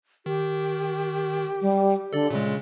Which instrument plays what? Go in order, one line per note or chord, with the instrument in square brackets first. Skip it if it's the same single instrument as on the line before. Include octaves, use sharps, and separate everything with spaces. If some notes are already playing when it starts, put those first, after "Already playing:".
[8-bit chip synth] D#3 [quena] G4
[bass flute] G3
[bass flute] D3 [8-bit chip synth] A4 D5
[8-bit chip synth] A#2 G#3 [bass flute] C#3